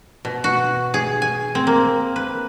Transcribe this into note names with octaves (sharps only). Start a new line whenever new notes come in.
B2
F#4
G#4
G#5
C4
A#3
B4